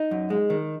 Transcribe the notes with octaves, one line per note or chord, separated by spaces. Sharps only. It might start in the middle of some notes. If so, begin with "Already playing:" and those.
Already playing: D#4
F#2
G#3
D#3